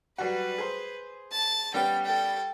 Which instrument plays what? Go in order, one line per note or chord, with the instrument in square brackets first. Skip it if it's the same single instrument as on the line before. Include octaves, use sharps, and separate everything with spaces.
[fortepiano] F#3 G3 F#4 [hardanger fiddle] B4
[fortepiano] G#4 C5
[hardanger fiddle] A5
[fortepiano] G3 B3 C#4 [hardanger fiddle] G5
[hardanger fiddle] A4 G5